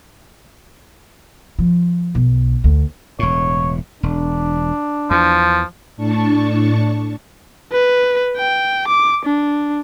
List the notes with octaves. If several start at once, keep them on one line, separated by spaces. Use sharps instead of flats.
F3
B1
D2
E1 A2 C#5
E1 D4
E2 F3
A2 D4 A5 C#6
B4
G5
D6
D4